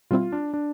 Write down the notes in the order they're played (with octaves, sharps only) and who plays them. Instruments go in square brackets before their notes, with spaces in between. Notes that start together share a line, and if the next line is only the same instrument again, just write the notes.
[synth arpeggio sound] B2 G3 C4 E4 [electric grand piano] F4
[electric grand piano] D4
D4